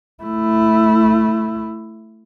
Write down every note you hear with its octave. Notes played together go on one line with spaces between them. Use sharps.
A3 E4